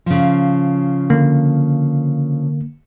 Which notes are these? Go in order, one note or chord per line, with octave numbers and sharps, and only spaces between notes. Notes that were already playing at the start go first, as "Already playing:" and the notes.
C#3 F3
D3 A#3